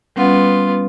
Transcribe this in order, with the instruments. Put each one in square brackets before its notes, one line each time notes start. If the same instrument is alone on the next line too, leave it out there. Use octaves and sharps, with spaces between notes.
[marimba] G3 C#4 F#5 [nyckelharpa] B3 F4